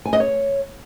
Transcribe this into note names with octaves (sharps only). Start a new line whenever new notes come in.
G#5
D#5
C#5